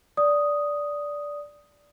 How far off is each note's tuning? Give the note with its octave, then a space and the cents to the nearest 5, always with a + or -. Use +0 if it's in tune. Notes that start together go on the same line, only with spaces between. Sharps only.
D5 -10 D#6 +0